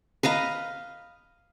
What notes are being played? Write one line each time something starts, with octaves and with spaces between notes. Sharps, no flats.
B4 D#5 F5 A#5